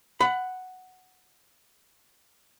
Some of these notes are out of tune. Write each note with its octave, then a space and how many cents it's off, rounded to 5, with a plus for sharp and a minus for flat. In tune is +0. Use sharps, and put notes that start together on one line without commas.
F#5 +0 B5 +20